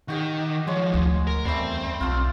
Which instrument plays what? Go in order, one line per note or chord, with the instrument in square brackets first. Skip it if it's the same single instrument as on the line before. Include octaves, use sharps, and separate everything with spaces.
[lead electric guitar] D#3 [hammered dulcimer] F#4 G4 D#5
[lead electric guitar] F3 F#3 [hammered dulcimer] G#3 C#5
[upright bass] D2
[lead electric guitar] A#4
[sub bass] E2 [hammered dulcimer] G3 A3 [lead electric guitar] C4
[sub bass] B1 [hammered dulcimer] A3 F4